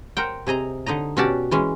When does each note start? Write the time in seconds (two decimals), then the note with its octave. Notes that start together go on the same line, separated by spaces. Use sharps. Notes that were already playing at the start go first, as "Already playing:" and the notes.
0.17 A#4 C5 F#5 G5
0.47 C3 G#4 D#5 A#5
0.86 D3 D#4 D#5 A#5
1.17 B2 C#4 F#4 G4 D5 A5
1.51 E3 G#3 C#4